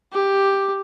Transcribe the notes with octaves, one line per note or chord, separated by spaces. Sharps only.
G4